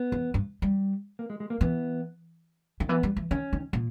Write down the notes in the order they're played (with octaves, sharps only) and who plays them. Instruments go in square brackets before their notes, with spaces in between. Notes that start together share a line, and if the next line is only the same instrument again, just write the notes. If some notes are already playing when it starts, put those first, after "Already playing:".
Already playing: [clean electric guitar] B3
[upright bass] E2
G2
G3
[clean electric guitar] A#3
G#3
G#3
A#3
[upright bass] E3 [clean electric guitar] B3
[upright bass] D#3
[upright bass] E3 [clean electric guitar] B3
[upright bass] G3
E3
[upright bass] D#3 [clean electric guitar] C#4
[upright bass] D#3
A#2